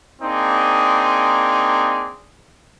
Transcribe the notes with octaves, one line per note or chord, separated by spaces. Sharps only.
A#3 C4 D4 D#4 G#4